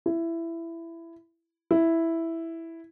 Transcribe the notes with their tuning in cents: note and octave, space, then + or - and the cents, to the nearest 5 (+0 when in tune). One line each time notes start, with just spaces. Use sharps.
E4 +15
E4 +0